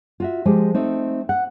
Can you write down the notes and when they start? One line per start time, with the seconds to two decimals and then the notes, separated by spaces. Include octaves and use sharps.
0.20 F4 F#4 E5
0.45 F3 G#3 G4
0.74 A3 C4 D#4
1.29 F#5